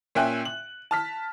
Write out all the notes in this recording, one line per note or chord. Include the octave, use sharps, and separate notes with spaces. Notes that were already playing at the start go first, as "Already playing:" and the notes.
A#2 C#4 E5 G5 G#5 F#6
F#7
A5 F6 B6